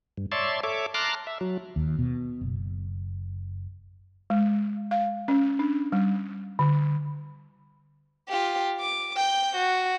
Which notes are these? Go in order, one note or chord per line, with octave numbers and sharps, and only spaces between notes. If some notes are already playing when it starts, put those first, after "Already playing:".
G2
C#5 D5 E5 A5 C6
A4 C#5 E5 D6
A5 A#5 C6 D6 F6 F#6
E5
F#3
D#2
B2
F#1
G#3
F5
C#4
D4
G3
D3
F4 G4
D6
G5 G6
F#4